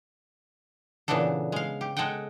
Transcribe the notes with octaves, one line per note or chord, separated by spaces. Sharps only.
A#2 C#3 E3 B3 D4 A4
G#3 F5
G4
G#3 A4 D#5 F#5 G5